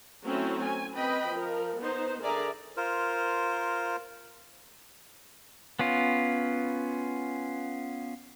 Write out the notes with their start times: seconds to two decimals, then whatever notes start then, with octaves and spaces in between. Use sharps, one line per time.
0.25 F#3 A3 C4 C#4 E4
0.63 G#5
0.96 C4 B4 D#5 G5 B5
1.31 F3 A#4
1.81 B3 D#4 C5
2.23 D3 G#4 A#4 D5 E5 A#5
2.77 F4 A#4 C5
5.79 B3 C#4 F4